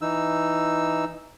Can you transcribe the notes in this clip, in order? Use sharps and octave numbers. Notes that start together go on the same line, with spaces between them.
E3 D#4 E6